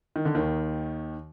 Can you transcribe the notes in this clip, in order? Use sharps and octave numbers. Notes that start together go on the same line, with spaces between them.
D#3
D3
D#2 D#3